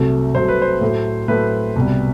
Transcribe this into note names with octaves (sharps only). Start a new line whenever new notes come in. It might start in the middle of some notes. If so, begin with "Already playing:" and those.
Already playing: C2 C3 F#3 A3
C2 C3 F#3 A3 C5
B4
C5
A2 F#3 A3
A2 F#3 A3 B4
C2 B2 G3